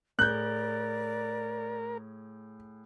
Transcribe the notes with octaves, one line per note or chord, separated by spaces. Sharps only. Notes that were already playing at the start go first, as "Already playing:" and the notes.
A2 G#4 A#4 D5 F#6 G6